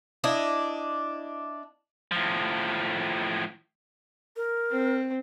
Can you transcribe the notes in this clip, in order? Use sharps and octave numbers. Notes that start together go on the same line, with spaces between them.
D4 E4 D#5
A2 F3
A#4
C4